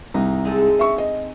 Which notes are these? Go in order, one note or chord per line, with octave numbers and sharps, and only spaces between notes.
C2 D#4
G#3 C4 A4
E5 C#6
D#5